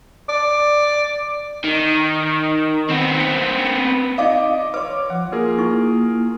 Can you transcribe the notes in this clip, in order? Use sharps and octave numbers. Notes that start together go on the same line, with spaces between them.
D5
D#3
B3 C4
D#4 D5 D#5 F5 D6
B4 C#5 C6 D6
F3 F#5
A#3 F4 G#4 A#4 B4
D#4 E4 C#6